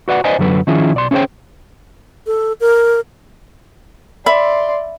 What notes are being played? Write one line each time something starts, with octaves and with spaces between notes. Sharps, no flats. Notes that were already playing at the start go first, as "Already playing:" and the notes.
F#4 B4 D5 F#5
B4 C5 D5 D#5 G#5
F#2 D3 F#3 A4 B4
D#3 F3 C#4 E4 F4 G#4
B1 D5 C6
C#4 E4 G#4 C5 C#5 G5
A4
A#4
D5 E5 B5 C6